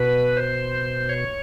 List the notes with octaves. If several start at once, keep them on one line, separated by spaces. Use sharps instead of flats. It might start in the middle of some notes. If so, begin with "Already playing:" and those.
Already playing: B2 B4
C5
C#5